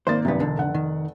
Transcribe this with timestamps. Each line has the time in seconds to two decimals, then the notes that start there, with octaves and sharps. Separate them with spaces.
0.07 G#1 A#3 C5 A6
0.25 G#1 F#2 C3 B3
0.40 E1 D3
0.57 F1 F#5
0.75 D#3